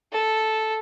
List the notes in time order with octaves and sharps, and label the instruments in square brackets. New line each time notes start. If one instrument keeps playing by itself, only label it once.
[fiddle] A4